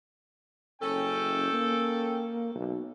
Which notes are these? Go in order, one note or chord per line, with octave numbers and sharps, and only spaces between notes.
F#1 C#4 A4 G5
A#3
B1